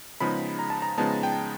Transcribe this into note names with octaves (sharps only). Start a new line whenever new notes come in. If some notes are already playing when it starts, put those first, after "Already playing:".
C#3 F3 G#3 B3 D#4 B5
A#5
A5
A#5
C#3 F3 G#3 B3 D#4 A5
G5